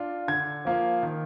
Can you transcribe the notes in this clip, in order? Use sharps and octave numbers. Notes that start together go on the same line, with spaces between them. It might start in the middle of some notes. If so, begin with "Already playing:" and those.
Already playing: D4 F4
D3 G#6
F3 A#3 F4
D#3